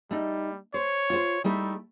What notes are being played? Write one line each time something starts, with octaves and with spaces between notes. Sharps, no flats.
G3 A3 D#4
C5 C#5
F4 C5
G3 A3 D#4 E4